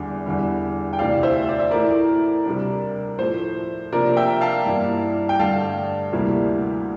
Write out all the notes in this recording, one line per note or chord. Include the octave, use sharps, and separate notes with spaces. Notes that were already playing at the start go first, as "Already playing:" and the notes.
Already playing: E2 D3 G3 D4
E2 D3 G3
G5
D2 C3 E3 D5 F5
C5 E5
D5
E5
A2 E3 A3 E4 A#4 D5
C3 G3 D4
A2 F3 A3 C5
C3 F3 A#3 D4 A#4 D5
E5 G5
F5 A5
G2 E3 G3 A#3 E4
G5
G2 D3 A3 F5 A5
D2 C3 G3 A#3 E4